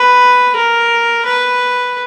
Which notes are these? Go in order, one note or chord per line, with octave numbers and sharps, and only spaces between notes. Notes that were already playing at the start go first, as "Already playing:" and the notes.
Already playing: B4
A#4
B4